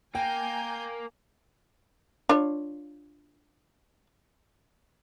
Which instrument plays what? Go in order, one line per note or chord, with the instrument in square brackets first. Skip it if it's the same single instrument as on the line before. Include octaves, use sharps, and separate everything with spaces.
[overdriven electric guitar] A#3 [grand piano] G5 [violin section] G#5 A#5 G6
[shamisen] D4 F4 C#5